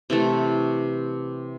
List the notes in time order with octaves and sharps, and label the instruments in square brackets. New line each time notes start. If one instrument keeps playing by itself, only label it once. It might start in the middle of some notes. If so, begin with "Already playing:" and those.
[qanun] C3 E3 A3